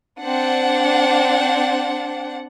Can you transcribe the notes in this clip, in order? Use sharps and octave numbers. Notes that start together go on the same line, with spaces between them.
C4 D4 F#5